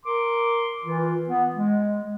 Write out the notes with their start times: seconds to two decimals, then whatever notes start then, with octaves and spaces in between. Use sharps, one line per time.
0.06 A#4 C6 D6
0.84 E3 F4
1.29 B3
1.56 G#3